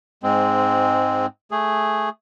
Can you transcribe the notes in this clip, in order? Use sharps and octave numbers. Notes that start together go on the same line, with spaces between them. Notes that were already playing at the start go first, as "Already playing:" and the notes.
G#2 G#3 C4
A3 G#4